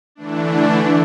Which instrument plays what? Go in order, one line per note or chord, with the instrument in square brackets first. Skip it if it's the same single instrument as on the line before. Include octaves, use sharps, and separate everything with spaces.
[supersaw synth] D3 E3 A3 D4